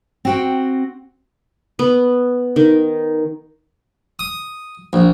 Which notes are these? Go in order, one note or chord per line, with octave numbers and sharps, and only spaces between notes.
C4 F#4 G5
B3
D#3
D#6
A#1